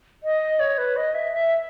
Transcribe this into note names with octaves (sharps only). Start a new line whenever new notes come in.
D#5
C#5
B4
D#5
E5
E5